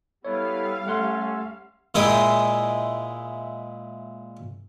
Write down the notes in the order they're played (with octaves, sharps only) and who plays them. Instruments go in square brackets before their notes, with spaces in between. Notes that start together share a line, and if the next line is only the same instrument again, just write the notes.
[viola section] G3 F5 [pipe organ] B3 E4 A4 [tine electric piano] C#5
[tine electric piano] A3 F#5 C6 [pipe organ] C#4 A4
[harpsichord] A#2 G#3 E4 G#4 G5